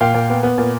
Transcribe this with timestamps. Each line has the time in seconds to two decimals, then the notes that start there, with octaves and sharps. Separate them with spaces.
0.01 A#2 F5 G5
0.14 A#2
0.30 B3
0.43 B3
0.58 A#2